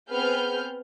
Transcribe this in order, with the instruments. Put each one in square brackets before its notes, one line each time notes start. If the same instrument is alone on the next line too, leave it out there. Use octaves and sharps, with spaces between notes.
[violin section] B3 C4 G#4 B4 F6 G6